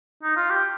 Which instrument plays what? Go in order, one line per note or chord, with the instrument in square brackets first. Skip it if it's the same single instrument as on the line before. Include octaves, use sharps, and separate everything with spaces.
[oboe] D#4
F4
G4